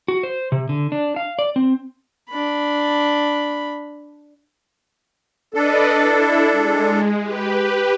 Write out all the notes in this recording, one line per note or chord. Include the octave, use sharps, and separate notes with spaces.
F#4
C5
C3
D3
D4
F5
D5
C4
D4 B5
D4 A4 B4 D5 D#5
E4
G#3
G4 B4